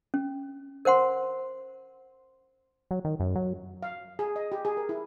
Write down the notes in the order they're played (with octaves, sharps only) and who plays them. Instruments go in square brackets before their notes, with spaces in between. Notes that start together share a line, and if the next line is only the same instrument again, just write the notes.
[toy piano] C#4
A#4 C5 F#5 C6
[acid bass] F#3
D#3
F#2
F#3
[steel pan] F5
G#4
D#5
G4
G#4
A#4
E4